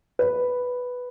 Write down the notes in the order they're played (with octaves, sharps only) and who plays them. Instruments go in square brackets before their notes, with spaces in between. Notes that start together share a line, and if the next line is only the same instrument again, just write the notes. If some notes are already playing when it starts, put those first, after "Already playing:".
[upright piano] B4